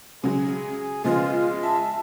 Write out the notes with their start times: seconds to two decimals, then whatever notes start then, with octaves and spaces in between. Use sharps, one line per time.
0.24 C#3 F#3 G#3 G#4
1.04 C#3 F3 G#3 B3 F4
1.63 E5 A5